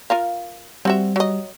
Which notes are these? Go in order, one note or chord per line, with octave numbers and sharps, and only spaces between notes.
F4 A#4 F5
G3 C4 F#4 E5
F#3 D#5